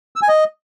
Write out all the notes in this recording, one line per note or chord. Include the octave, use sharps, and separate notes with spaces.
E6
G#5
D#5